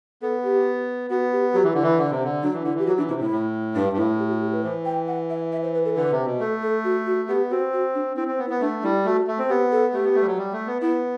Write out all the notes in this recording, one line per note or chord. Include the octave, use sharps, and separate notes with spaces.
B3 A4
G4
B3 F#4
G4
F#3 G4
E3
D3 E4
E3
D3 D4
C3
D3
F#3 D4
E3
D3 E4
E3 G4
F#3 F#4
E3 D4
C3 E4
A2 E4
A2
G2 D4
G2
A2 E4
G4
F#4
G4
B4
E3 C5
G5
F#5
E5
E5
C5
B4
A4
D3 B4
C3
B2
A3 A4
A4
F#4
F#4
B3 G4
C4 F#4
F#4
D4
C4 E4
C4
B3
E4
B3
A3 D4
G3 E4
A3 F#4
A3
C4
B3 G4
A4
A3 G4
B3
A3
G3
F#3
G3
A3
B3
B3 E4